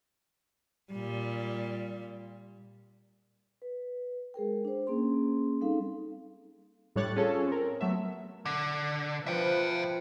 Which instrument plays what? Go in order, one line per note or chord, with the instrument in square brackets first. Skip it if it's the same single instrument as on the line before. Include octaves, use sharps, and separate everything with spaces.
[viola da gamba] A#2 G3
[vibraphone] B4
G#3 G#4 A#4 G5
D4 C5
A#3 C#4 G#4 C6
G3 C4 D#4 A4 F5
[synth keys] A2 G3 D4 C#5 F#6 A6
C#4 F4 G#4 A4 C#5
C4 A#4
F#3 A3 B3 E5
[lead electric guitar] D3
[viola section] F3 B4 [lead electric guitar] E5 G5